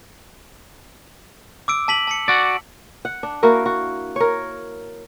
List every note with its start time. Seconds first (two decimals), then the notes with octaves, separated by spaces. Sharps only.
1.68 D6 E6 D7
1.88 A5 B6 F#7
2.07 A5 B6 C#7
2.28 F#4 D5
3.05 F#5
3.23 D4
3.43 A#3 E4 F#4 A#4
3.66 F#4
4.16 A#4 C#5